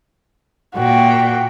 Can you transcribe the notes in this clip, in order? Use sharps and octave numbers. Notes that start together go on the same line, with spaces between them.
A#2 F#4 G5